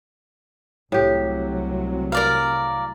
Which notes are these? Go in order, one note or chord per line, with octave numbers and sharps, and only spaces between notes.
C2 A2 C3 F#3 G4
A#4 D5 F5